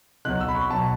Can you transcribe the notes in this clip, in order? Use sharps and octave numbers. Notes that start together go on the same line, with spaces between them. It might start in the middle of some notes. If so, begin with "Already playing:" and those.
B1 B2 F#3 F#6
E6
B5
C#6
B2 F#3 A5